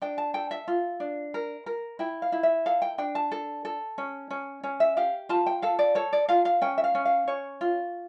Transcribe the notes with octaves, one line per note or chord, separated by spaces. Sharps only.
D4 G5
A5
A4 G5
E5
F4
D4
A#4
A#4
E4 G5
F5
E4
E5
A4 F5
G5
D4 G5
A5
A4
A4
C#4
C#4
C#4
E5
G4 F5
F4 A5
G5
A4 F5
D5
A4 C#5
D5
F4 F5
F5
C#4 G5
E5
F5
C#4
F5
C#4 C#5
F4